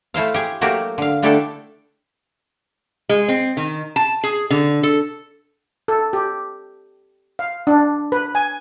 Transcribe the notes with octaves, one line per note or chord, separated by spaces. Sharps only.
A3 E4 C5 F5
G4 G#4
F#3 A3 A#3 F#4 G4
D3 F5
D3 A3 D4 E4 G4 A4
G#3
C4
D#3
A5
G#4
D3
A4
A4
G4
F5
D4
B4
G#5